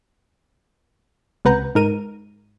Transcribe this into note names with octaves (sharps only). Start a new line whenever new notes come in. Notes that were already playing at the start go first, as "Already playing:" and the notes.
C#2 C3 B4 F#5 A#5 G6
G#2 A#4 D#7